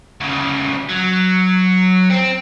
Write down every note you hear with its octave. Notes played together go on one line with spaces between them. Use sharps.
D2 C#3
F#3
C4